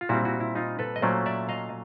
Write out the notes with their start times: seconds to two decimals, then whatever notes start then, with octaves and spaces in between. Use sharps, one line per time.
0.01 F4
0.09 A#2 G3 C4 E4 F#4
0.25 E4 F#4
0.40 E4
0.55 D#4 F4
0.79 A4 B4
0.96 D#5
1.02 A#2 F#3 A3 C#4 C5 D5
1.26 D5 E5
1.49 D#5 F5